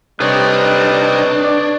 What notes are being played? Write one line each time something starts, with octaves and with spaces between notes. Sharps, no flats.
C3 G3 D4 D#4 B4 C#5
D5